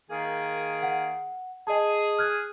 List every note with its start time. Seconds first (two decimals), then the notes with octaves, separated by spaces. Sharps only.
0.10 D#3 A#3 G#4
0.83 F#5
1.67 G#4 D#5 A5
2.19 F6 F#6 G#6